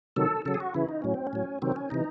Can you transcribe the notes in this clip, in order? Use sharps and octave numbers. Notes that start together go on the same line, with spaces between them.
C3 D#3 F#3 A4
C#3 F#3 A4
G#4
F#4
C#3 E3 E4
D#4
A2 F#3 C#4
C4
C#4
A2 F#3
C3 D#3 F#3 C4
C#4
C3 E3 D#4